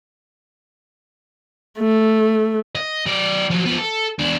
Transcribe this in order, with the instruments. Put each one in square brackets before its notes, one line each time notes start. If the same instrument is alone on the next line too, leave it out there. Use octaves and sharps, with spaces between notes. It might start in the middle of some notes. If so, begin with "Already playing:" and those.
[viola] A3
[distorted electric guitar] D#5
F#3 D5
F3 F#3
F3 B3
A4
E2 D4